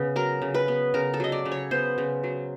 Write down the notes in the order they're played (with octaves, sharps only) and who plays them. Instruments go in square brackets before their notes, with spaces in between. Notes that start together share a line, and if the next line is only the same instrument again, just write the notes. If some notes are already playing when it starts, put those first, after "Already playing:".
Already playing: [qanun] C#3 B3
F#3 A#4
C#3
B4
B3
C#3 A#4
A4
F#3 D#5
D5
C#3
C#5
B3 C5
C#3
F#3